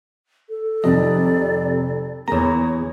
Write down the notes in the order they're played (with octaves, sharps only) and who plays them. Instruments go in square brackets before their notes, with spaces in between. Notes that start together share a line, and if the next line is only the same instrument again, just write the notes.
[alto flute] A4
[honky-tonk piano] F2 C3 D#3 [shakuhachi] D5 [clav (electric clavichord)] D#5
[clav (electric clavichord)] E2 A#5 [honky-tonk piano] A#3 C#5 [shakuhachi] G#4